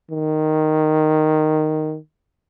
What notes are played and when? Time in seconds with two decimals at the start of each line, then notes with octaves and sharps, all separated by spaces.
0.11 D#3